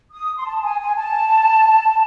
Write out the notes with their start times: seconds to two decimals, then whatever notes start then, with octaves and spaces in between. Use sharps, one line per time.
0.11 D#6
0.37 C6
0.45 A5
0.62 G#5
0.79 G#5
0.96 A5